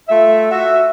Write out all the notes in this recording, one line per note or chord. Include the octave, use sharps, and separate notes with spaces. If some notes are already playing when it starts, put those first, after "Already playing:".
A3 F4 E5
F#4 E5